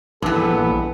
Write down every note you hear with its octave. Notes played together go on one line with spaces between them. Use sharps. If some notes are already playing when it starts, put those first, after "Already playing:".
A#1 E2 G2 E3 B3 A4